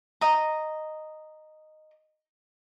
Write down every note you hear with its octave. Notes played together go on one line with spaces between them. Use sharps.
D#5 A#5